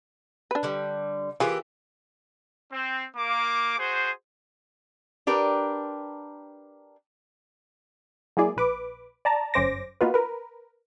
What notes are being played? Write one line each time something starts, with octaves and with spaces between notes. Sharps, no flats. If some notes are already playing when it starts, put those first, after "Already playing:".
D4 B4
D3 G3
E3 A#3 F4 G4 G#4
C4
A#3 D6
F#4 G#4 C5
D4 G4 A#4 B4
F#3 G#3 A#3 E4 G#4 D5
A#1 B4 D6
D5 A5 A#5
G1 F#2 C#4 C5 D6 A#6
A#3 B3 D#4 F4 F#4 B4
A#4 B4